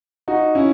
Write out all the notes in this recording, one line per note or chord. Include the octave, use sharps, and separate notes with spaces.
D#4 F#4
C#4 E4